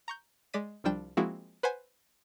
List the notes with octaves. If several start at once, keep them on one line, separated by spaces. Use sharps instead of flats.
A#5 C#6 G6
G#3 D5 A6 B6 D#7
C2 F3 G3 D4 G5 E7
F3 G#3 A#3 C4 E4 F#4
B4 C5 F#5 G#5